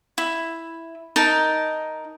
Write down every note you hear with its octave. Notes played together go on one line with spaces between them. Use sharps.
E4
D#4 A#4 A5